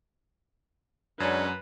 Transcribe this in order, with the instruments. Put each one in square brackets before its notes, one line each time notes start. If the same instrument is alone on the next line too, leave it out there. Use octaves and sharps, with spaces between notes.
[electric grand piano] F#2 [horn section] F#3 G#3 C#4 [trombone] D4 [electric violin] B4